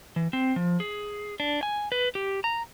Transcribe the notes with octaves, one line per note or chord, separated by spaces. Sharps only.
E3
C4
F3
G#4
D4
G#5
B4
G4
A#5